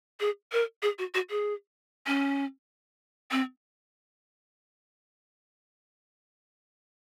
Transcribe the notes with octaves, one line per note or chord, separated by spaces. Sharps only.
G#4
A#4
G#4
F#4
F#4
G#4
C#4
C4